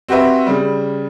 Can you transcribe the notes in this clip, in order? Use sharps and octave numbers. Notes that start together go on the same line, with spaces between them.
C4 F#4 G4 B4 E5
C#3 G3